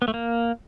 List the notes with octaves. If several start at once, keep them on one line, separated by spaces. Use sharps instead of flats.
B3
A3
A#3